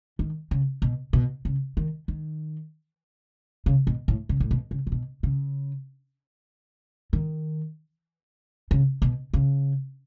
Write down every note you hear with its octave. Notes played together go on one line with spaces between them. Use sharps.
D#3
C#3
B2
B2
C#3
D#3
D#3
C#3
B2
A2
C#3
A2
B2
C#3
C#3
B2
C#3
D#3
C#3
B2
C#3